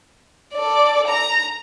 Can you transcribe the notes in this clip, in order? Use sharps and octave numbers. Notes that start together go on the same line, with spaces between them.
A4 D5
A#5